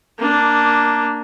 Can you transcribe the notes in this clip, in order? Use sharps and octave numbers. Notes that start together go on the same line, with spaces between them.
A#3 D4